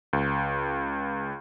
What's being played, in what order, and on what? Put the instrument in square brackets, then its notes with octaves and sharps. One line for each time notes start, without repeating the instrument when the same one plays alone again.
[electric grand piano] C#2